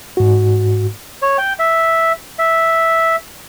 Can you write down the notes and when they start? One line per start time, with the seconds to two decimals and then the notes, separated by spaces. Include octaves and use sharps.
0.17 G#2 F#4
1.22 C#5
1.38 G5
1.59 E5
2.39 E5